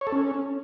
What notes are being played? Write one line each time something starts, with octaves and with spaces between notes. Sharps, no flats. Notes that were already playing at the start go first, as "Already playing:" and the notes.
C#5
A4
C#4